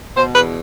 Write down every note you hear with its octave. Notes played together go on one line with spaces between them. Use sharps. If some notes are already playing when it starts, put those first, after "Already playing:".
B2 C5
E2 B4